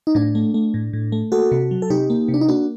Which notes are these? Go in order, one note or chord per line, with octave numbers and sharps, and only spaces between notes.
D#4
A2 D4
A3
A3
A2
A2
A3
A#3 F#4 A4
C3
F#3
A4
C3 D#4 G4
A#3
C3
D4
D#4
A#3 D4 F#4